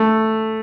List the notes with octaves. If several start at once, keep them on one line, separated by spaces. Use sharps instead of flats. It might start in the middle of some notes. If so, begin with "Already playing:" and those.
Already playing: A3